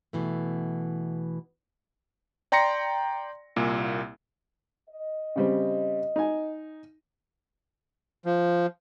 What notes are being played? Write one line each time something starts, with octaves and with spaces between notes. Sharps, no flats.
B2 E3 A3
D5 G5 A#5 C6 A#6 C#7
C2 A#2 A#3
D#5
C#3 G3 C4
D#4 G#5
F3